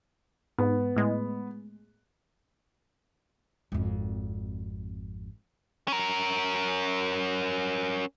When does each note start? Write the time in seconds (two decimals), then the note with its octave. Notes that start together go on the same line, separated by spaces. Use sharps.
0.58 G#2 B3
0.96 A2 G#3
3.72 G#1 F2
5.88 C#4 A#4